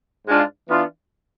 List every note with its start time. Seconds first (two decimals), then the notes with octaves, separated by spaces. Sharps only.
0.27 G#2 G#3 D4 F4
0.68 E3 B3 D4 F4